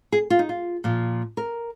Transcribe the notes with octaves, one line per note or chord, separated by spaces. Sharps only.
G#4
F4
D#4
F4
A#2 F3
A#4